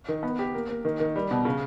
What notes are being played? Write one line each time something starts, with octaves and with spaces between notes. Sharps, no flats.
D#3
B3
G4
A#3
A#3
D#3
D#3
G3
B2
C#3